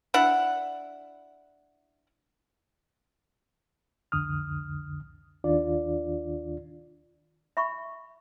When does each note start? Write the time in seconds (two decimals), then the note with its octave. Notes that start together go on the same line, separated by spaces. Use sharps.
0.14 D4 E4 F#5
4.12 C2 F2 D3 D#6 F6
5.44 D#2 D#3 D4 F4 D5
7.57 E5 B5 C#6